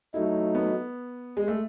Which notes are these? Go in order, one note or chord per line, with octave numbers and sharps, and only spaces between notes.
F#3 A3 D#4 E4
B3
G#3
A3